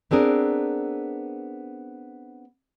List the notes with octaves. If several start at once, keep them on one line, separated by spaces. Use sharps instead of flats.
B3 C4 D4 G#4 A#4